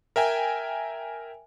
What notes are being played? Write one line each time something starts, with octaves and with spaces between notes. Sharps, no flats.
A#4 E5 G5 G#5